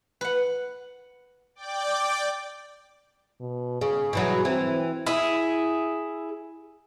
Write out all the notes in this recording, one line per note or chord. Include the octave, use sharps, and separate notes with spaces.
B4 F#5
D5 G5 D6
B2
C#3 G#4
B2 E3 F#3
E3 C4
E4 G#4